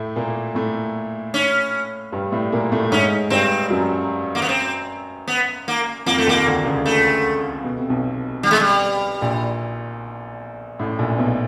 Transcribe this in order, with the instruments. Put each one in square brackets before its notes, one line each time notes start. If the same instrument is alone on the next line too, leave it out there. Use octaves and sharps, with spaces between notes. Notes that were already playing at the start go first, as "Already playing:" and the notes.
Already playing: [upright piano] A2 A3
A#2 A#3
A2 A3
[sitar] C#4
[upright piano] G2 G3
A2 A3
A#2 A#3
A2 A3
A3
[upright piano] G#2 G#3 [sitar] C#4
[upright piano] G2 G3 [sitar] C4
[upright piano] F#2 F#3
[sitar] A#3
B3
C4
B3
A#3
[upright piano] F2 F3 [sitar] A#3
[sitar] A3
[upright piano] D#2 D#3 [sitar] A#3
[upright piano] D2 D3
C#2 C#3
[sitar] A3
[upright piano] B2
C3
B1 B2
[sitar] G3
G#3
G3
[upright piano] A#1 A#2
A1 A2
A#1 A#2
B1 B2